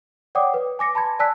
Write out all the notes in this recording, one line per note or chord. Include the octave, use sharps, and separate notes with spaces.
C#5 D5 F#5 G5 D6 D#6
B4
G#5 D6 A#6 C#7
A5 B5 C6 G#6
D5 G#5 A5 E6 F#6 B6